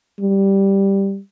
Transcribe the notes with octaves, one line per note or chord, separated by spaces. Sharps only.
G3